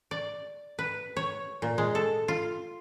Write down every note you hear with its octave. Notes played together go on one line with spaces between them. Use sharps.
D5
B4
C#5
A#2
G#3
A4
F4